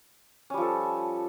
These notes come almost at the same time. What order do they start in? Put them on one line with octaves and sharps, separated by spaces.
C#4 G3 F3 A4